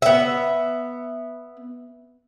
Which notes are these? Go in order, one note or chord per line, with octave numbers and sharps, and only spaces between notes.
B3 E5